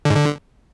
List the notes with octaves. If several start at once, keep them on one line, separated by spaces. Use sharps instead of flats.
D3
G#2
D3